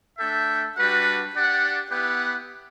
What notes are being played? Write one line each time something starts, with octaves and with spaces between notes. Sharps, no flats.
A3 D4 A4 E5 G5
G3 D4 F#4 B4 F#5
D4 G4 D5 F#5
B3 E4 G4 B4 F#5